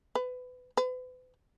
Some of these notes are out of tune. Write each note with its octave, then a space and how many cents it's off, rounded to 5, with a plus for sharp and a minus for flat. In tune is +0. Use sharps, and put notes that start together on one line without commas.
B4 +25
B4 +40